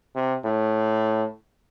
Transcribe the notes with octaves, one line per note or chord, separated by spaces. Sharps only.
C3
A2